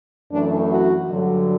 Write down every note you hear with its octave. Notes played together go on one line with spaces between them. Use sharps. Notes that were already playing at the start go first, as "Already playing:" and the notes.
F#2 E3 A3 D4
F#4
G2 D3 F#3